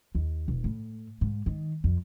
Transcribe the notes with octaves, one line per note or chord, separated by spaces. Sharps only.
D#2
E1
A2
G#2
D#3
F2